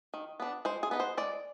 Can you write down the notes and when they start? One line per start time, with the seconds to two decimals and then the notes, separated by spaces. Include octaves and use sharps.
0.14 D#3
0.40 B3 D4
0.65 G#3 C5
0.83 G#4
0.91 B3 D#4
1.00 C5
1.17 G#3 D5